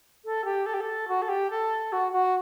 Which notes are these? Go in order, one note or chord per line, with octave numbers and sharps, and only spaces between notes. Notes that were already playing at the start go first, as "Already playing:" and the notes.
A4
G4
A4
G4
A4
F#4
A4
G4
A4
F#4
F#4